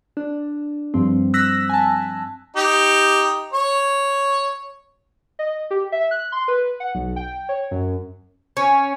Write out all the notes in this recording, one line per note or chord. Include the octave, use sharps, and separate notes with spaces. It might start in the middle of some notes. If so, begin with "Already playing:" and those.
D4
G2 F3 G3 C4
E6 F#6 A#6 B6
G#5 A5
D#4 G4
C#5
D#5
G4
E5
F#6
C6
B4
F#5
B1
G5
C#5
F#2
C#4